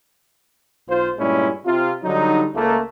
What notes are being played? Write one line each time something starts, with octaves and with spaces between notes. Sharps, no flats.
B1 F4 C5
G2 A#2 G3 G#3 C#4 E4
C3 F4
D3 F#3 G3 D#4
C#2 A3 A#3